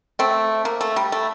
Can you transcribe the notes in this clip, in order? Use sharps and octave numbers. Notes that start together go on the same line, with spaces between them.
A3 C4
A#3
A3
G3
A3